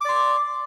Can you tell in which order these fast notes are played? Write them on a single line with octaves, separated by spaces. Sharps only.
D6 D5 C6